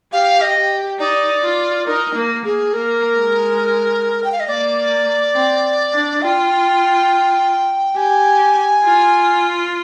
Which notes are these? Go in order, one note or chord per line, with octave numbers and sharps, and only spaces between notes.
G4 F5
D#5
G4
D#4 D5
F4
D#4 A#4
A#3
A#3 G#4
A#3 A#4
G#3
G5
F5
D#5
A#3 D5
C4
D4
F4 G5
G4 G#5
F4